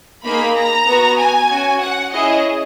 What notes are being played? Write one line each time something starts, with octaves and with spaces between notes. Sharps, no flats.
A#3 D#4 G#4 B5
A#5
B3 F#4
G#5
C#4 F#4
F#5
C#4 E4 G#4 D#5